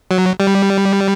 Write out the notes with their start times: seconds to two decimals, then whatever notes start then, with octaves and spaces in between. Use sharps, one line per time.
0.11 F#3
0.40 G3